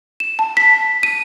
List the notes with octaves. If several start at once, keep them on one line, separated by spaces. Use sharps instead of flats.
E7
A5
B6
D#7